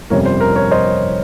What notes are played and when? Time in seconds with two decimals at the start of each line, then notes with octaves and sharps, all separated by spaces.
0.10 G1 F2 C3 G3 C#4 A#4 C#5
0.25 C5
0.41 A#4
0.56 A#4 C#5
0.71 C5 D#5